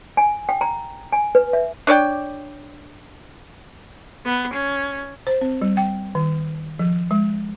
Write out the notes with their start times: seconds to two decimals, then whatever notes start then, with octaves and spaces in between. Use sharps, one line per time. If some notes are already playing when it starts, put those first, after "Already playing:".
0.17 G#5
0.49 G5
0.61 A#5
1.12 G#5
1.35 B4
1.53 E5
1.87 D4 C#5 D5 G5
4.25 B3
4.54 C#4
5.27 C5
5.41 C4
5.62 G3
5.77 G5
6.15 D#3
6.79 F3
7.11 G#3